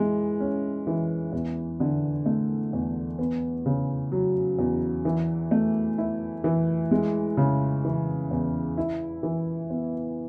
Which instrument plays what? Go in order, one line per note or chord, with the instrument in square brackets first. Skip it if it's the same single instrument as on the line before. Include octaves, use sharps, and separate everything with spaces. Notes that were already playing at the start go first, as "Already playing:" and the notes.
Already playing: [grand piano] E3 G#3
C#4
E3
E2
D3
A3
E2
B3
C#3
F#3
E2
E3
A3
E4
E3
G#3
C#3
E3
E2
E4
E3
B3